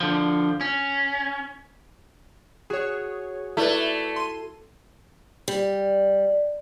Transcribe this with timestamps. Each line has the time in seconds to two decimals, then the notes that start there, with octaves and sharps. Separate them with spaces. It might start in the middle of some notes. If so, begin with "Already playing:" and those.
0.01 D3 F3
0.61 C#4
2.70 F#4 G#4 C#5
3.57 A3 E4 B4 D5 E5 G#6
4.16 C6 D#7
5.48 G3